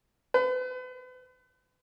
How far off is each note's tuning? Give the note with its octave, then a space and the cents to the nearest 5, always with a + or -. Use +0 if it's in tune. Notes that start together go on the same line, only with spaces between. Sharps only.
B4 +40